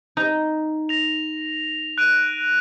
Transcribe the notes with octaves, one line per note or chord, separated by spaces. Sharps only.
D#4
A#6 F7
F#6 D7 D#7